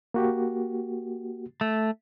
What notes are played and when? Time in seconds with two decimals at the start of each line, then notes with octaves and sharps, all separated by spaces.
0.14 A#3 F#4 G4
1.61 A3